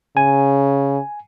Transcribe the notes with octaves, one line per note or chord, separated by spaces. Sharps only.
C#3 G#5